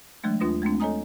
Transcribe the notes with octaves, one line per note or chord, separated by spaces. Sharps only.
E3 F#3 G#3 A3 D4
D#2 D4 F4 B4 D#6 A#6
G#3 A3 C4 D4
A4 C#5 D#5 G#5 A#5 D#6